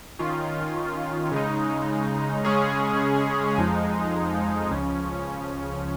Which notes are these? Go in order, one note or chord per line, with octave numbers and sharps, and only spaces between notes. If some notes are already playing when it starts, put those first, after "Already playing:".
D#3 C#4 F4
C#3 G#3 D#4
C#3 G#3 C#4 G#4
F2 F3 G#3 D#4
C#2 C#3 F3 C#4